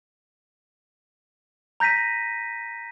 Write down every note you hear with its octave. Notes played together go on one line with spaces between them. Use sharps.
A#5 G6 A#6 B6 D#7